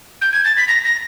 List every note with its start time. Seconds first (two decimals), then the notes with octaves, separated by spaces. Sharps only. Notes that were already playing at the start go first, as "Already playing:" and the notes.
0.21 G6
0.33 G#6
0.45 A6
0.57 B6
0.68 A#6
0.84 A#6